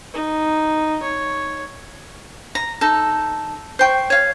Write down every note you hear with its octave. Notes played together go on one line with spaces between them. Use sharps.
D#4
C#5
A#5
D#4 A4
C5 G5 C#6
C#5 F5